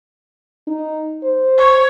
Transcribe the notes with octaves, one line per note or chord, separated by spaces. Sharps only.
D#4
C5
C#5